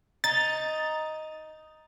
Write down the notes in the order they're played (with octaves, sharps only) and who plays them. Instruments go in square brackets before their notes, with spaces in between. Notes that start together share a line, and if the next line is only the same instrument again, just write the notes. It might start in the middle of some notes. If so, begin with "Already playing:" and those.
[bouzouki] D#4 [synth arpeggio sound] A6